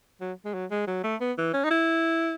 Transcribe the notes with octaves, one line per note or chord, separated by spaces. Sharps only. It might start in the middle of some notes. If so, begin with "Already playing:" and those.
F#3
G#3
F#3
G#3
F#3
A3
B3
E3
C#4
D#4
E4